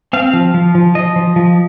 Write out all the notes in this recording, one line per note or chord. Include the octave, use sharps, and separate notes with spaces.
C4 F5
F3
F3
F3
F3 D#5
F3
F3